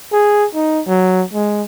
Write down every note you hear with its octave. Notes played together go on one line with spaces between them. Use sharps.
G#4
D#4
F#3
G#3